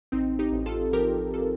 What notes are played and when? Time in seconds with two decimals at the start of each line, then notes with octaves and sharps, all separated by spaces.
0.12 A1 C4 D#4
0.39 D#4 G4
0.52 A1
0.66 F4 A4
0.93 F3 G4 A#4
1.34 F4 A4